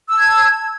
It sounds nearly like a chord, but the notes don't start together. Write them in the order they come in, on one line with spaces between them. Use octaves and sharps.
E6 A5 G#6